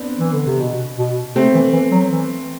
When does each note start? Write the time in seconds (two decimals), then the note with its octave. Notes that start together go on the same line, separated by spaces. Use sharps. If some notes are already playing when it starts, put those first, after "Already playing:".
Already playing: B3 C4 D4
0.19 E3
0.33 D3
0.46 C3
0.60 B2
0.98 B2
1.35 C3 A3 C4
1.54 E3
1.73 E3
1.91 F#3
2.11 E3